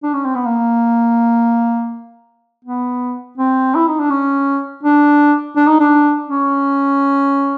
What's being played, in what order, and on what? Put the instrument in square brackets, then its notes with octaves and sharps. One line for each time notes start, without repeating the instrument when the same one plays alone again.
[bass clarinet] D4
C#4
C4
B3
A#3
B3
C4
E4
D#4
D4
C#4
D4
D4
D#4
D4
C#4